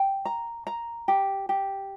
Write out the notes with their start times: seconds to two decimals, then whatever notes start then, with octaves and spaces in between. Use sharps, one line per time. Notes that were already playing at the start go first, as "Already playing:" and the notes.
Already playing: G5
0.25 A#5
0.67 A#5
1.08 G4
1.49 G4